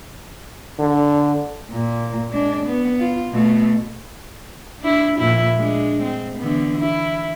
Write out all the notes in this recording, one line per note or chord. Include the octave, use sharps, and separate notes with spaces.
D3
A#2
G#3 D4
B3
F4
B2 A3
D4 E4
F2 A#2 E4
G#3 D4
C4
D3 E3 B3
E4